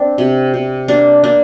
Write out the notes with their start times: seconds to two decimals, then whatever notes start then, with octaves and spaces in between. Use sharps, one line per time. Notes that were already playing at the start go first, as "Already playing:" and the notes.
Already playing: C4 D4
0.18 C3
0.54 C3
0.88 A#3 D4
1.24 A#3 D4